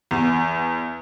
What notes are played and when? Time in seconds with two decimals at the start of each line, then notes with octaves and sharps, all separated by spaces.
0.11 E2